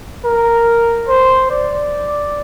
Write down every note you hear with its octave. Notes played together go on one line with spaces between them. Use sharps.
A#4
C5
D5